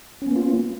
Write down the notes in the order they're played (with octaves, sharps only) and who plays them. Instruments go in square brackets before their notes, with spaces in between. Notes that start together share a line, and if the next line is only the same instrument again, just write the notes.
[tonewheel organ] C#4
B3
A#3
F4